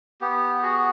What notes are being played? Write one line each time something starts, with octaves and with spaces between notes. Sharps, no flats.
B3 G4
F#4 G#4